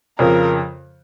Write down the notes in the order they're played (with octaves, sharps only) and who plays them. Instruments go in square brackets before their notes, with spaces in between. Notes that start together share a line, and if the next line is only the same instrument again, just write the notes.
[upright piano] F2 C#3 F3 [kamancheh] A#4